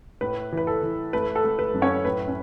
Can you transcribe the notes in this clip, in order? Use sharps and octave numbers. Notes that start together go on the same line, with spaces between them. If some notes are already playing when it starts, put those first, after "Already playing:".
A2 B4
E3
B4
A4
E3
A3 B4
A4
A3
B4
F#2
C#4 C#5
A2 B4
C#4